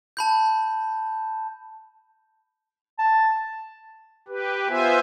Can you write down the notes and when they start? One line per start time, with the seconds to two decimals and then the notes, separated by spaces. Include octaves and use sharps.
0.17 A5 B5 G6
2.99 A5
4.28 G4 B4
4.69 B3 F4 C5 E5 G#5